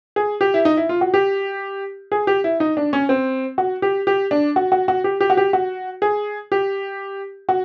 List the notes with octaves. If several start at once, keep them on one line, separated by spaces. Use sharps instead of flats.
G#4
G4
E4
D#4
E4
F4
F#4
G4
G#4
G4
E4
D#4
D4
C#4
C4
F#4
G4
G4
D4
F#4
F#4
F#4
G4
G4
F#4
G4
F#4
G#4
G4
F#4